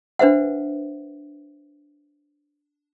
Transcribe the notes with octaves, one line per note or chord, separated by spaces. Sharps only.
D4 B4 C5 E5 F#5